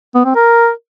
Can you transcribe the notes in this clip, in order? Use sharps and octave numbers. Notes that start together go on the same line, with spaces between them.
B3
C4
A#4